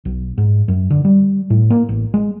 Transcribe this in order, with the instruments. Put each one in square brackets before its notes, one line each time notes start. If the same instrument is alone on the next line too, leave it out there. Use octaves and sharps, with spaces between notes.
[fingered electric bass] B1
G#2
F#2
D3
G3
A2
A#3
A1
G#3